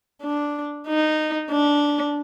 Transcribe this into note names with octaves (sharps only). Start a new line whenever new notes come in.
D4
D#4
D4